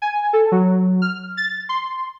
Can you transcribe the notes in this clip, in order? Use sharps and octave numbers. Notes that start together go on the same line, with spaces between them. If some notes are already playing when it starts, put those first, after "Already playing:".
G#5
A4
F#3
F6
A6
C6